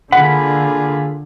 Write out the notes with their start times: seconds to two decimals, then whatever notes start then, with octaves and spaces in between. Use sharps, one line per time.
0.12 D3 A#3 F4 G#4 F#5 B5